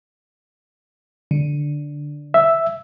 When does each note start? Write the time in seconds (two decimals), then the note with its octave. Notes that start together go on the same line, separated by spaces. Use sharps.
1.31 D3
2.34 E5